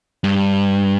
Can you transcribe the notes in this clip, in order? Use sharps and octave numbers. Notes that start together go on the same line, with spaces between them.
G2